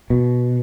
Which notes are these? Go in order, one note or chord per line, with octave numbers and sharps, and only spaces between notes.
B2